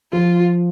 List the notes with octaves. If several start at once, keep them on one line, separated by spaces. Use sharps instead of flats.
F3 F4